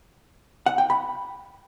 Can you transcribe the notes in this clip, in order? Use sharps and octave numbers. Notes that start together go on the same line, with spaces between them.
F#5
G5
B5